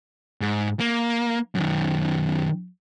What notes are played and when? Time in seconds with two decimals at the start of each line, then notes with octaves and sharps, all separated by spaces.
0.41 G#2
0.80 A#3
1.55 F#2 D#3